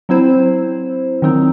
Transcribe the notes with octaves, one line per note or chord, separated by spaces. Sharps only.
F#3 C4 E4 C5
D#3 F#3 C4 D#4